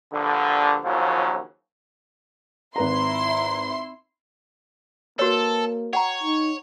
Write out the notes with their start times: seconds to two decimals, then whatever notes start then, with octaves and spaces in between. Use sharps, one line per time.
0.13 A#1 G2 D3
0.85 A#1 D#2 C#3 F3 F#3
2.76 G#1 E4 B4 A#5 C6
5.19 A#3 F#4 A4 B4 C#5
5.93 C#5 F#5 G5 A#5
6.23 D#4